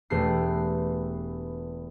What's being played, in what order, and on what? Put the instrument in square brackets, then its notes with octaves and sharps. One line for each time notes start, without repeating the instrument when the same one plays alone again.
[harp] E1 A3 B3 G4 C7